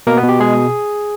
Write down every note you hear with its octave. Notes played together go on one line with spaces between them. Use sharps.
B2 A#3 A#4
B3 B4
B2
G4
G#3 G#4